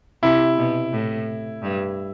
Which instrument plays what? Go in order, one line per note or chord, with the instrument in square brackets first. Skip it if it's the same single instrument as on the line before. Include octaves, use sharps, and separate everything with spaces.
[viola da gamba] C3 [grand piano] E4
[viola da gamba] B2
A2
G2